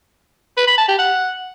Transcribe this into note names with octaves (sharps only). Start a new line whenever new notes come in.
B4
B5
A5
G4
F#5